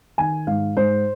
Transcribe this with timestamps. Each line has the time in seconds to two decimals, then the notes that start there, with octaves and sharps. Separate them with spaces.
0.18 D#3 G#5
0.47 G#2 F5
0.76 G#2 C5